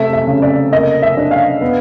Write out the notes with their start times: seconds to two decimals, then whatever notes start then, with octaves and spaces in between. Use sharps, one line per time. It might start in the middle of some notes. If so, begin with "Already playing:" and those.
Already playing: C3 A3 E5
0.13 E5
0.27 C#3
0.42 D5
0.72 A#3 D#5
1.02 E5
1.17 D4
1.31 F5
1.61 B3